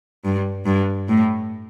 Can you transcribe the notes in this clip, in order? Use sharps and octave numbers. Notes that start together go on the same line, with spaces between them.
G2
G2
A2